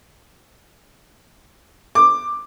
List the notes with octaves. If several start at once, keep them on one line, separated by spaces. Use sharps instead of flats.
D6